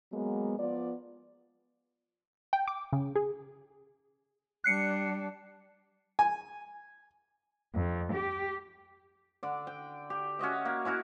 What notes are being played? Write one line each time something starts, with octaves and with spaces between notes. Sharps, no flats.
F#3 G#3 A#3 B3
F3 B3 F4 D5
G5
D6
C#3
G#4
G3 D4 F#6 C7 C#7
G#5
F2
G4
D3 D5
G5
G4
C#4 F#4 D#5 E5
A#3
C#4 E4 F#4 A#4